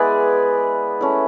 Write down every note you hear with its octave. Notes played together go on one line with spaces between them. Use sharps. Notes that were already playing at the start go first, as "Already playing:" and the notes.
Already playing: G#3 B3 E4 G#4 B4 D5
A3 C#4 E4